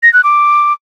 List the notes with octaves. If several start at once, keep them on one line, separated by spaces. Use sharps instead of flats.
A#6
F#6
D6